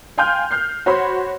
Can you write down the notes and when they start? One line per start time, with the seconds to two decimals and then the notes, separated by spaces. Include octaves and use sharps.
0.18 F5 G5 G#5 C6 F6 G6
0.51 F6 G6 C7
0.86 F#4 C5 C#5 B5 C6